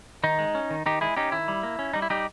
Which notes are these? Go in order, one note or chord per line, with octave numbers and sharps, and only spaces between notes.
D#3 D#4
G#3
C#4
D#3
D#3 D#4 G4
G#3 E4 G#4
C#4 D#4 G4
D#3 E4
G3
A#3
C#4
G3 D#4
E4
G3 D#4 G4